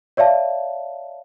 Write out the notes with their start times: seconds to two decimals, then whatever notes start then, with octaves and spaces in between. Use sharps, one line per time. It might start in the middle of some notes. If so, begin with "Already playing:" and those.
0.17 C#5 D5 E5 F5 A5